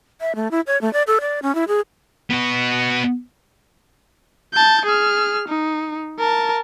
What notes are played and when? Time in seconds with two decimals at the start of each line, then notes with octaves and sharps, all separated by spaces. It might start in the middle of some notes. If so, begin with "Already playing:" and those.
0.21 E5
0.35 A3
0.51 E4
0.67 C#5
0.81 A3
0.93 D5
1.07 A4
1.21 D5
1.42 C#4
1.55 E4
1.68 G#4
2.30 B3 F#4
4.54 A5 G6
4.86 G#4 F6
5.48 D#4
6.19 A#4 A5